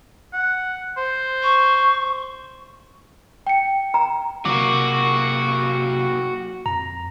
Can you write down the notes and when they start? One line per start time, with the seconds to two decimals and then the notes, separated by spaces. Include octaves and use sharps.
0.33 F#5
0.97 C5
1.43 C#6
3.47 G5 C#7
3.94 A#5
4.45 C3 F#3 A#3 F#4 D6
6.66 F2 A#5